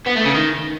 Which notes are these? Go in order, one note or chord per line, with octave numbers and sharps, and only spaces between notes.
B3
A3
C#3
D#3